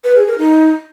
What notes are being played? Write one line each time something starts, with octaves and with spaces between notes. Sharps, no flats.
B4
G#4
A#4
D#4